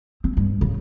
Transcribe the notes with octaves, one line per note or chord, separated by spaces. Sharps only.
C4
G2
C#3